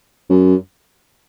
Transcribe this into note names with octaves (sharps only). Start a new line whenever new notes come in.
F#2